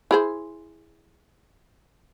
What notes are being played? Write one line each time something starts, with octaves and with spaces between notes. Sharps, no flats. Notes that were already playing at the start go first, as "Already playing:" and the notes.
E4 G#4 C5